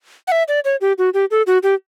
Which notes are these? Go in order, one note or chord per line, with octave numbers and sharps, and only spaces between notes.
F#5
E5
D5
C#5
G4
F#4
G4
A4
F#4
G4